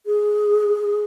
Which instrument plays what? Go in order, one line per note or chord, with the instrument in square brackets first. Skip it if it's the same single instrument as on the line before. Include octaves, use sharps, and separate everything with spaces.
[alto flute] G#4